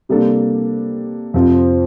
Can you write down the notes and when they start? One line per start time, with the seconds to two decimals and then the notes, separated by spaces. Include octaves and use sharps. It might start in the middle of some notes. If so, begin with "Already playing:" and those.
0.09 C3 G3 A#3 D4 A4
1.34 F2 C3 F3 C4